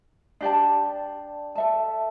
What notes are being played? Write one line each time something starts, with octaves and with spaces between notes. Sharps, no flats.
D4 G4 D5 A5
A4 E5 A5